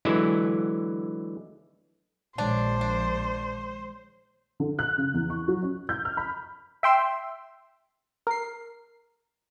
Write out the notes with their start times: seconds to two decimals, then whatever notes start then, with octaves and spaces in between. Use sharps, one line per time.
0.05 D3 E3 F#3 G#3 E4
2.38 A#1 D#3 G#3 D4 C5 C#5
2.81 D4
4.60 D3
4.79 F#6
4.98 C#3
5.14 E2
5.30 C#6
5.48 F#3
5.62 C#4
5.89 G6
6.05 F6
6.17 B5
6.83 E5 G5 C6 E6
8.27 A#4 C7